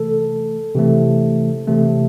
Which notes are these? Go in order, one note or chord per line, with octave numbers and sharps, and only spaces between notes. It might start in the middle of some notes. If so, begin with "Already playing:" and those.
Already playing: C3 E3 A3 A4
C3 E3 A3
C3 E3 A3